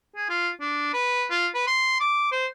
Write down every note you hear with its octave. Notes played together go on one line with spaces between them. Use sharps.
G#4
F4
D4
B4
F4
B4
C6
D6
C5